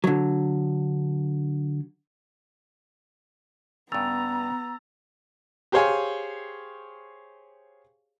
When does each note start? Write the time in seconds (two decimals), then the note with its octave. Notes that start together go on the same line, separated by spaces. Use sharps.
0.04 D3 F#3
3.92 G2 C#3 B3 A#5 E6 A6 F7
5.72 G4 G#4 C5 C#5 F5 G#5